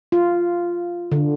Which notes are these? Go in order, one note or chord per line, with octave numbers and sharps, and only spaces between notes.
F4
D3